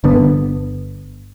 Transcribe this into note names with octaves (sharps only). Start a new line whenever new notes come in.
G1 D3 B3